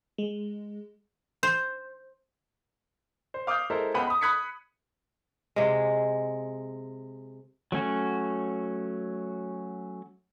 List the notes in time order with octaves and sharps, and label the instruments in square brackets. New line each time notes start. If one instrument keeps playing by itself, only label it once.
[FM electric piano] G#3
[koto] C5
[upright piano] C5
F5 D6 D#6 F6 G6
G#3 E4 A4 A#4 C5
C#2 B3 F#5 G5 B5 D#7
B5 D#6
B5 D#6 F#6 G#6 B6 C#7
[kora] C3 G#3
[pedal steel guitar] F#3 A3 C#4 F#4